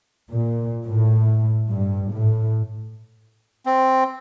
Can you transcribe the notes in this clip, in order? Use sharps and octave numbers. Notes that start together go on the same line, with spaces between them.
A#2
A2
G2
A2
C4